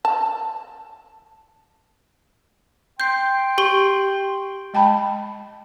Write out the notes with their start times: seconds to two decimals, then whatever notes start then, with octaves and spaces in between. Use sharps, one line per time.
0.05 A5
3.00 G5 C6 G6 C7
3.58 G4 C#6 G7
4.74 G#3 G5 A5 B5